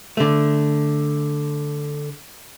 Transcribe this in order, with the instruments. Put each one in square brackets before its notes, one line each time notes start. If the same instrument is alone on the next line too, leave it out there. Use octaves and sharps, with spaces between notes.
[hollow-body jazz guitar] D3 A3